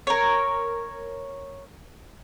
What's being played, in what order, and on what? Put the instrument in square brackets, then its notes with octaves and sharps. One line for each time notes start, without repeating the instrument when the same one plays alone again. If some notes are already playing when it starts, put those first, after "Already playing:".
[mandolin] A#4 C#5